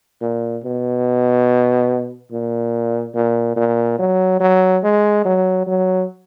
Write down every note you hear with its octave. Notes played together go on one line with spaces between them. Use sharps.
A#2
B2
A#2
A#2
A#2
F#3
F#3
G#3
F#3
F#3